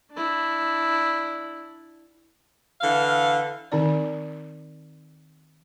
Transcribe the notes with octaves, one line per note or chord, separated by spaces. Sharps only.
D4 E4
D3 E3 F5
D#3 C4 D#4 D5